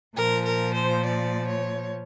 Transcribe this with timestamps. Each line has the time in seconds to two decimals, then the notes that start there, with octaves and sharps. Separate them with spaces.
0.16 A#2 F3 A#4
0.45 A#4
0.74 C5
1.04 D5
1.47 C#5